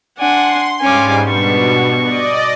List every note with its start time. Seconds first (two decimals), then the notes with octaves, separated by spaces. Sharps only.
0.19 D4 F#5 G#5 C6
0.81 G#2 G3 C#4 F5 G#5 D6
1.28 B2 B3 D4 C#6
1.99 D5 D#5